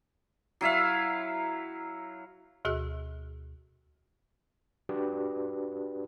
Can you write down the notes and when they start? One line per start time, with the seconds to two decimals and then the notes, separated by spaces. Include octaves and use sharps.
0.61 F#3 E4 E5 F5
2.65 D2 B2 F#4 G#4 E6 F#6
4.89 D4 F#4 G4 B4 D5